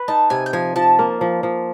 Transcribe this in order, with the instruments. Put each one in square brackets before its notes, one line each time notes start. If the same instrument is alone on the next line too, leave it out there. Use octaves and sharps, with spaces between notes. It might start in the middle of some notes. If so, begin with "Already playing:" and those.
Already playing: [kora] B4
[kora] D#4 [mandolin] A5
[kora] C3 [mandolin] G#5
[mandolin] G5
[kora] F3 [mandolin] G#5
[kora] F3 [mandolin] A5
[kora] A#3
F3
F3